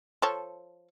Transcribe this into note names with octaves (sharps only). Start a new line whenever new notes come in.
F3 A4 C#5